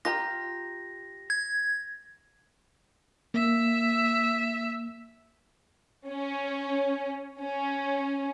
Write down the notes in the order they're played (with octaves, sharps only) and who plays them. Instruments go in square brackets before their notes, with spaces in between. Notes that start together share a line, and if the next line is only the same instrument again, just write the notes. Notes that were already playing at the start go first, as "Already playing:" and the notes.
[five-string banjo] F4 G4 A#5 [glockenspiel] A#6
[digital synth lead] G#6
[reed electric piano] A#3 [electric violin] E5 E6
[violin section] C#4
C#4